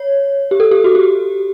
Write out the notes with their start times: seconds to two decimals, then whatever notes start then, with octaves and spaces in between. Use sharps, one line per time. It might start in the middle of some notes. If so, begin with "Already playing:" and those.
Already playing: C#5
0.51 G4
0.60 A4
0.71 G4
0.84 F#4
0.95 G4